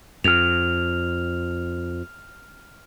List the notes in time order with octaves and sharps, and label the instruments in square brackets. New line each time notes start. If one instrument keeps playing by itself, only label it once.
[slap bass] F2 [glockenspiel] F6 F7